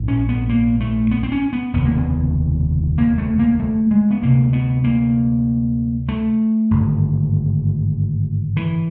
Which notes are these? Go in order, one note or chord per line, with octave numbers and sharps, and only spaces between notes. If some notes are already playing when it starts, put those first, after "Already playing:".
Already playing: A#1 G#2
C#4
B3
A#3
A3
B3
C4
C#4
B3
F1 D#2 C#3 B3
A#3
B3
A#3
A3
A#3
A3
G#3
B3
D2 C3 A#3
B3
A#3
A3
G#1 G2 D3
E3